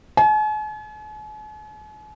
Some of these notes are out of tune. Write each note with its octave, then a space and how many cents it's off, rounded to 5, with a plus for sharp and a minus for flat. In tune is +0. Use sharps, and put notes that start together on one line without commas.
G#5 +45